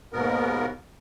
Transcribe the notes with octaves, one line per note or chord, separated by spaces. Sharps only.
D#2 G#2 B2 B3 A#4